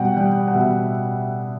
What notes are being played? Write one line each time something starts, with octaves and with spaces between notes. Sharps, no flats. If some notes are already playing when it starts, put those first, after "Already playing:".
Already playing: B2 G3 F#5 G5
G3 G5
F#5
B2 E5